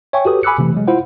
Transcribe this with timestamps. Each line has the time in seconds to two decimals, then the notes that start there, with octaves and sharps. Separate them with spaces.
0.13 C#5 E5 G5 G#5 C#6
0.25 F#4 G4 A4 B4 D#6
0.43 G#5 B5 D6 E6 F#6 C#7
0.58 C3 E3 A3
0.74 F#3 G#3
0.87 E4 F4 C5 F#5